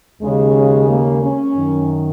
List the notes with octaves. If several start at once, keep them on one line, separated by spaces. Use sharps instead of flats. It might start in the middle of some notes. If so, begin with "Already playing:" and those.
D#2 C#3 G#3
A#3
C#4
F#2 D#3